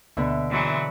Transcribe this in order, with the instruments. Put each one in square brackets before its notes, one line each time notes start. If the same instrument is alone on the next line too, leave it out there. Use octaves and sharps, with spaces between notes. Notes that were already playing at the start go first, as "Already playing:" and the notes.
[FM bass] D2 [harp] B2 D3 [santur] E5 B5
[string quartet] E3 F#3 G#3